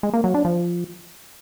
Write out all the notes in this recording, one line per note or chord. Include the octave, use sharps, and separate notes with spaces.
G#3
A#3
F#3
D4
F3